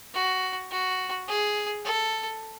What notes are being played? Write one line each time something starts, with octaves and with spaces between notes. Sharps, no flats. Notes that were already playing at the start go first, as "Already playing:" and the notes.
F#4
F#4
G#4
A4